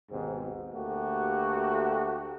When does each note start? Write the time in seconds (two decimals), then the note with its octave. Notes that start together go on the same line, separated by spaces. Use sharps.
0.11 G#1 D#2 G#2 B2 C4
0.74 D2 A3 A#3 F#4 G4